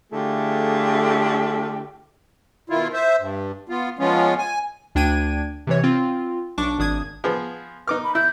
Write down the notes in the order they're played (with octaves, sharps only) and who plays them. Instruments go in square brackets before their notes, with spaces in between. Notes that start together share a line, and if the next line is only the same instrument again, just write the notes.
[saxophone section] D3 A3 E4 F4 G4 G#4
[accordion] B2 D#3 E4 F4
C5 E5
G2
B3 F4
F3 G#3 B3 C#4 F4
G#5
[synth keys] D2 D4 G5 G#6 D#7
C3 E3 C#5
C4 F4
B1 D4 C#6 D6
G#1 D4 D#6 G#6
[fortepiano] F3 B3 G#4
[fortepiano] D#4 D6 F6 [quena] B4
[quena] B5
[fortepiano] E4 [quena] G6